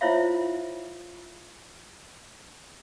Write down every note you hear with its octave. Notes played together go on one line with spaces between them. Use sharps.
E4 F4 C5 C#5 E5 F5